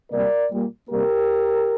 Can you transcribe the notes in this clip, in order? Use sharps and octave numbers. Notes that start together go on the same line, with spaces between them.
C3 G3 A#3 A#4 D5
A#2 G3 A#3
C3 G3 A#3 G4 A#4